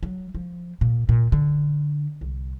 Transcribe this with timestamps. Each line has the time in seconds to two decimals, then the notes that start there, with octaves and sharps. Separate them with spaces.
0.03 F#3
0.35 F3
0.81 A#2
1.09 A#2
1.32 D3
2.21 C2